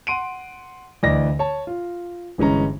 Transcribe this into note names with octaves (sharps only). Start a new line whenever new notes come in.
F#5 C6 D7 D#7
D2 E3 D5 D#5 A#6
C#5 A5
F4
G1 E3 G#3 C#4 A#5